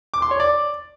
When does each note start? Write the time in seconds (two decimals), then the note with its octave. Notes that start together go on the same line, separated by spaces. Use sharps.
0.14 D6
0.22 C6
0.31 C#5
0.40 D5